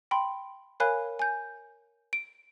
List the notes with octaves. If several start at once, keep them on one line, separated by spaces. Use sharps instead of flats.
G5 B5 C6
A#4 C#5 F5 G#5 B5 F#6
G#5 G6
D7